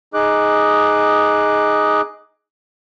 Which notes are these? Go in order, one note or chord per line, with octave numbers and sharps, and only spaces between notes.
D#4 G#4 D#5 D6 F#6